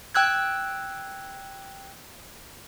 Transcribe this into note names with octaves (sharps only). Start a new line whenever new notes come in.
G5 E6 F#6 G#6